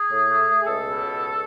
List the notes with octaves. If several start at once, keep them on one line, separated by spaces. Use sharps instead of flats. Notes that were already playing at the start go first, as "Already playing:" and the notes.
Already playing: G#4
A2
A3
A3
G#4
C#2 A4
B2
C#2